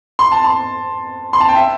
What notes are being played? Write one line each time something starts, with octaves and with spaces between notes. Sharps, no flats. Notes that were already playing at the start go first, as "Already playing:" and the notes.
C6
A5
C6
C6
A5
G5
E5